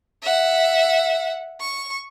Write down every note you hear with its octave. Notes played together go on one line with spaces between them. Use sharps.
E5 F#5
C#6